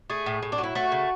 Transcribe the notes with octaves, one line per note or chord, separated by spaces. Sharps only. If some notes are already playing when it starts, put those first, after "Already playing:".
A3 G#4
A2
A2
D4
F#3
E4
A3 F#4
C#3